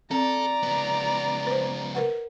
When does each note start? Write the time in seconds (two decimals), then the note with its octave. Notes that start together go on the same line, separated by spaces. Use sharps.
0.11 C4 A4 D5 A#5
0.63 C#2 B3
1.47 B4 C5
1.95 A#4 B4 F#5